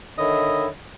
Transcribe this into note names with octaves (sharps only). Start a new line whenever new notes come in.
D3 D#3 C#5 D#5 E5 B5